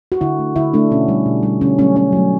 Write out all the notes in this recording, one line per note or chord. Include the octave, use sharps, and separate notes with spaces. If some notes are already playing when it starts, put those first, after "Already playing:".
F#4
D3 E4
A3
D3 E4
A3 D4
B2 C#4
G3
B2
G3
D3 C#4
F#3 A3 C#4
D3 C#4
F#3 A3